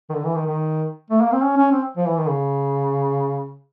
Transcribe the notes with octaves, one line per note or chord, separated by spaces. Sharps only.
D#3
D3
E3
D#3
D#3
A3
A#3
C4
C#4
C#4
C4
F3
E3
D#3
C#3